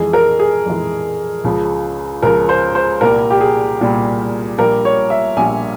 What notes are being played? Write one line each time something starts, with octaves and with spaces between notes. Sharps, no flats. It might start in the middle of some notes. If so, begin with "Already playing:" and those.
Already playing: F2 E3 G#3 G#4
A#4
G#4
F2 E3 G#3
C#2 C#3 F3
C#2 C#3 F3 A#4
C5
C5
C2 A#2 G3 A#4
G4
G#4
C2 A#2 G3
A#1 A#2 G3 A#4
C#5
E5
A#1 A#2 G3 G#5